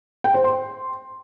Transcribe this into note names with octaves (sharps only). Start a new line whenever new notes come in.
G5
C5
C6